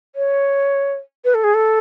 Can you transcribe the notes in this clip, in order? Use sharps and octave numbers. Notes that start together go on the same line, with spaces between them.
C#5
B4
A4
G#4
A4